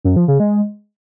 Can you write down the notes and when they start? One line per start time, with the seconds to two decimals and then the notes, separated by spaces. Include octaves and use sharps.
0.04 F#2
0.16 F3
0.28 C#3
0.40 G#3